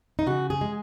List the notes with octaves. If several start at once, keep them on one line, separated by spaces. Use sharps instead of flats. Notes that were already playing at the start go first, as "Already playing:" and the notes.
D#4
C#3 F#4
G#4
G#3